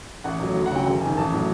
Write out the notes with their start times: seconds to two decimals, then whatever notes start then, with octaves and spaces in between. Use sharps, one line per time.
0.24 A1 F#5
0.40 A2 F#3
0.55 D2
0.66 F#5
0.71 C#3 F#3 G5
0.86 F#1 G5
1.01 F2 C3 D#3 G#5
1.17 A1 A5
1.32 A2 F#3